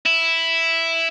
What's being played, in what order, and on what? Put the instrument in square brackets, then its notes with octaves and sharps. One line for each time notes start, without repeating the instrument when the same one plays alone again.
[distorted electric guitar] E4